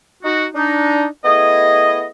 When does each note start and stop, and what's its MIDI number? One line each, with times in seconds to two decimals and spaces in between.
0.24 0.45 63
0.24 0.45 66
0.55 1.05 62
0.55 1.05 63
1.25 2.06 57
1.25 2.06 59
1.25 2.06 64
1.25 2.06 68
1.25 2.06 75